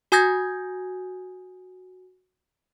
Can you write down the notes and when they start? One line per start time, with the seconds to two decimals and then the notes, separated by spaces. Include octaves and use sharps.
0.12 F#4 G#5 D#6 G6 G#6 A#6